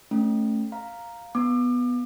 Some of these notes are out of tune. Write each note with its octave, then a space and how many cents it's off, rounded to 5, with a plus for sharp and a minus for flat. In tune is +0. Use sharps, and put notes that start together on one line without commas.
A3 +0 C#4 -10
F5 +0 A#5 +0
B3 +0 D6 +35